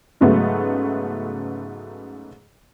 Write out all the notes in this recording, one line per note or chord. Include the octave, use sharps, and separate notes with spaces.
G#2 C#3 F#3 A3 B3